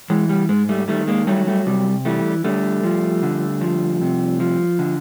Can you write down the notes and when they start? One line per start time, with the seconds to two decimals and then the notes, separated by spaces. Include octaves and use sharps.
0.10 E3 G#3
0.29 G3
0.49 G#2 G#3
0.69 G3 A3
0.88 D#3 G3 A3
1.07 G#3 A#3
1.27 F#3 G3 A3
1.47 G3 A3
1.66 C3 G3
2.05 E3 G3 A3
2.44 D3 G3 A3
2.83 F3
3.23 D3
3.61 F3
4.01 C3
4.40 F3
4.79 D3